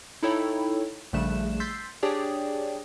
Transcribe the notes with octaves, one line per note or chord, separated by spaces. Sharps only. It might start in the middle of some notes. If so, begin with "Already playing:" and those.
D#4 E4 A4 C#5 G5 B5
A#1 C#3 G3 A3 F#6 E7
C6 E6 G6 A6 B6 C7
D4 G4 G#4 C#5 D5 G5